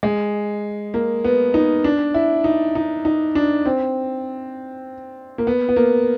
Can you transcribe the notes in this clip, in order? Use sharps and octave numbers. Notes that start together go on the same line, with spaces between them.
G#3
A#3
B3
D#4
D4
E4
D#4
D#4
D#4
D4
C4
A#3
B3
B3
A#3